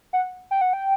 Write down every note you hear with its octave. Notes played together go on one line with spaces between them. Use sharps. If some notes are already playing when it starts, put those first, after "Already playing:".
F#5
G5
F#5
G5